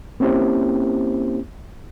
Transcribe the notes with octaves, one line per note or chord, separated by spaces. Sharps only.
A#3 C4 C#4 E4 G4 C5